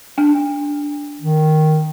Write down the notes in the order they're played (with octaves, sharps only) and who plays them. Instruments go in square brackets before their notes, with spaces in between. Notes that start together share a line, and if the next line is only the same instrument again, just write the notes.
[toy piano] D4
[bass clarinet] D#3